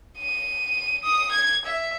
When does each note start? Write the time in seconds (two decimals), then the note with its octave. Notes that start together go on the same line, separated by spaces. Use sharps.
0.19 D#7
1.03 D#6
1.32 G#6
1.65 E5